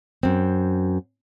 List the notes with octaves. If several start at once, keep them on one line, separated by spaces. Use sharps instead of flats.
F#2 C4